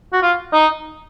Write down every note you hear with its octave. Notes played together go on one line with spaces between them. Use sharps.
F#4
F4
D#4